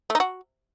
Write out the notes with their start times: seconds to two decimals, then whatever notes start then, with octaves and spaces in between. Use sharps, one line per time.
0.10 A3
0.15 D#4
0.20 F#4